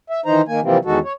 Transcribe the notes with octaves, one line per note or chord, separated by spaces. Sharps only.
E5
D#3 E3 D#4 C5 A#5
D#3 A#3 G#5
C3 E3 F3 G3 A#3 C4
E2 D#3 G#3 F#4 A4
C#5